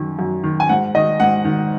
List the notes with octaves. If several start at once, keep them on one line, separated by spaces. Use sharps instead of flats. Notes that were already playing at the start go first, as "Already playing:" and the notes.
Already playing: F#2 D#3
F#2
D#3
G#5
G#2 F#5
D#3 D#5
G#2 F#5
D#3